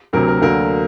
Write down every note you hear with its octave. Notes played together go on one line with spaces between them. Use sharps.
D2 C3 F#3 A#4
A#4
D2 D3 F#3 A#3 A#4